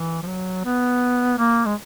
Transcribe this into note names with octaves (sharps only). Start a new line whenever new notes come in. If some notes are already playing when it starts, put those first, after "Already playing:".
Already playing: E3
F3
F#3
B3
A#3
G#3